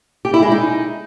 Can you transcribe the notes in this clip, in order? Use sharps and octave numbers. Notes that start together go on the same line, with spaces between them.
G4
E4
G#3
D#4